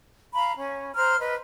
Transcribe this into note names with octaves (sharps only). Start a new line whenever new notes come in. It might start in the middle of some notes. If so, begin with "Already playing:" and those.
F5 A#5 B5
C#4
C5 A#5 F6
B4 D#5